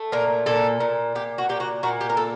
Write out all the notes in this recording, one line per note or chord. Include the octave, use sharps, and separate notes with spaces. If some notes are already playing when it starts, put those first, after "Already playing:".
Already playing: A3
A#2 A#4
A#2 A4
A#2
A#2 G4
F#4
A#2 G4
F#4
A#2 F#4
G4
A#4
A3 A4